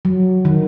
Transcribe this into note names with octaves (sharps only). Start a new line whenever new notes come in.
F#3
D#3